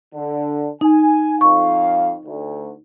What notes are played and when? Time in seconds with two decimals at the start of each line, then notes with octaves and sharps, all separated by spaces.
0.15 D3
0.81 D#4 G#5
1.41 F2 F5 C#6
2.26 D2